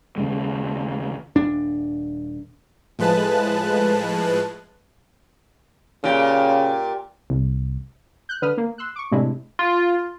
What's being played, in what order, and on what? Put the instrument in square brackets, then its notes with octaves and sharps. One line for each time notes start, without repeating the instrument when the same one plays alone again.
[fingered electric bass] D#2 C#3 G#3
[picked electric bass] D#1 D4
[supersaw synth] A2 F3 G#3 B4 A5 F#6
[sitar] A#2 G4 [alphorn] C#3
[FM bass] C2
[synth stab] F#6 G6
D3 B4 D#6 F6
A#3
C6 E6 F#6
C#6 D6
A2 C3 G#3 D4 E4
[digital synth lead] F4